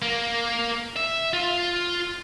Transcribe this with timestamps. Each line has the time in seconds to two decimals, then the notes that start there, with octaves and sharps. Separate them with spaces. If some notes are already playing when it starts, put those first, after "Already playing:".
0.02 A#3
0.97 E5
1.33 F4